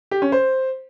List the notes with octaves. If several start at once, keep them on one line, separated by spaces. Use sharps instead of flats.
G4
C#4
C5